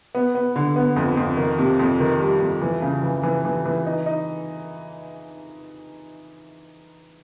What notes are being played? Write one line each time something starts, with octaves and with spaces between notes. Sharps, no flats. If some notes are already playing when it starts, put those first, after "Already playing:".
B3
B3
D3
B3
F2
F2
D#3
C3
F2
D#3
G3
F2
E3
C#3
E3
E3
E3
E3
D#4
D#4